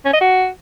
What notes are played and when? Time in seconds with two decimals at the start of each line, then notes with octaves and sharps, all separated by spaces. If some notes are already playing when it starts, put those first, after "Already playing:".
0.05 C#4
0.13 D#5
0.21 F#4